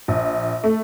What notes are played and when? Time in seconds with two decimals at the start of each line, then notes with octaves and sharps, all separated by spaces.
0.08 A#1
0.64 A3